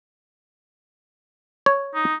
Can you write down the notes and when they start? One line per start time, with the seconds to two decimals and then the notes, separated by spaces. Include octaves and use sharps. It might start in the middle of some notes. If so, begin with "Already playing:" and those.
1.66 C#5
1.95 D#4